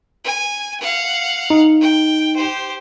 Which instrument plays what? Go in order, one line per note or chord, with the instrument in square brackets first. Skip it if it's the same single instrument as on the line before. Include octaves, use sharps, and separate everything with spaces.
[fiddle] G#5
F5 F#5
[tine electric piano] D#4
[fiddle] G5
G4 C5